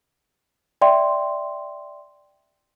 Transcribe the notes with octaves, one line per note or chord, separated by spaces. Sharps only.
D5 E5 G5 C6